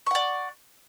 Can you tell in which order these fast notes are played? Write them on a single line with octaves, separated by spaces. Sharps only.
C#6 F#5 D5